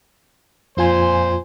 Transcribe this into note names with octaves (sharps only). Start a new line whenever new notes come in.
F2 A#2 F4 C5 G#5